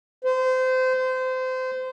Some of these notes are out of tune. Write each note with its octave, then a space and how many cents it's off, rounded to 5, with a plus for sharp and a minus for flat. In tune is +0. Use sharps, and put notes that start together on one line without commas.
C5 -25
C5 -25